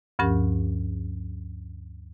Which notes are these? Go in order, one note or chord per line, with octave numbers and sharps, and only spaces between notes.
D2 G2 F3 C#4 G4 A#4